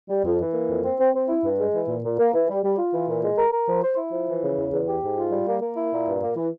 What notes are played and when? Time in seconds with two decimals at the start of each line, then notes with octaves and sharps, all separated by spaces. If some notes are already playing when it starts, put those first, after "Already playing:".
0.10 G3
0.25 F2
0.40 E3
0.54 A#3
0.69 F2
0.84 C4
1.00 C4
1.14 C4
1.29 E4
1.44 G2
1.59 G#3
1.73 E3
1.88 A#2
2.04 A#2
2.18 A#3
2.34 E3
2.49 G3
2.64 G3
2.78 F4
2.94 E3
3.08 A#2
3.24 G#3
3.38 A#4
3.53 A#4
3.68 F3
3.83 C5
3.97 E4
4.12 F3
4.27 E3
4.43 C#3
4.57 E2
4.73 E2
4.88 G4
5.03 G#2
5.18 F4
5.32 G3
5.48 A#3
5.62 A#3
5.77 E4
5.92 A#2
6.07 G2
6.22 A#3
6.36 E3